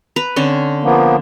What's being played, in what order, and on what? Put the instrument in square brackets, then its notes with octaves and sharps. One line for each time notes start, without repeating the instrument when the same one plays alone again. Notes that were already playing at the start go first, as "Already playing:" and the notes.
[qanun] B4 A#5
D3 C4 C#4
[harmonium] F3 A#3 B3